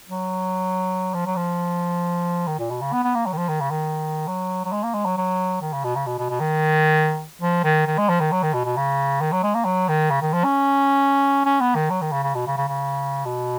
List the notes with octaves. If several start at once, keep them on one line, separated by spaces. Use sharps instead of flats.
F#3
F3
F#3
F3
D#3
A#2
B2
C#3
B3
B3
A#3
F#3
D#3
F3
D#3
C#3
D#3
F#3
F#3
G#3
A#3
G#3
F#3
F#3
D#3
C#3
B2
C#3
B2
B2
B2
D#3
F3
D#3
D#3
G#3
F3
D#3
F#3
D#3
B2
B2
C#3
D#3
F#3
G#3
A#3
F#3
D#3
C#3
D#3
F3
C#4
C#4
B3
D#3
F#3
D#3
C#3
C#3
B2
C#3
C#3
C#3
B2